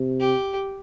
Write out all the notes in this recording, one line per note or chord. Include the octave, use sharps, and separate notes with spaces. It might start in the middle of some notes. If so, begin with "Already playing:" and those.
Already playing: C3
G4